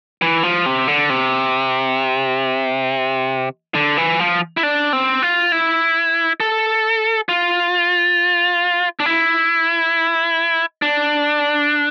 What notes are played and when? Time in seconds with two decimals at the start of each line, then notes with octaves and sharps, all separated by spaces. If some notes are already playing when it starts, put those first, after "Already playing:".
0.22 E3
0.43 F3
0.66 C3
0.88 D3
1.10 C3
3.75 D3
3.97 E3
4.20 F3
4.57 E4
4.63 D4
4.93 C4
5.22 F4
5.52 E4
6.40 A4
7.29 F4
9.00 D4
9.06 E4
10.82 D4